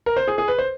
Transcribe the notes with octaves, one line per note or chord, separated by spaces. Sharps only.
A#4
C5
G#4
G#4
B4
C5